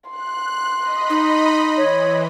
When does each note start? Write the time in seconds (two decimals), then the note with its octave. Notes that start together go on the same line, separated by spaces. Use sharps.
0.10 C6 F#6
0.80 D#5 B5
1.10 D#4
1.77 E3 C#5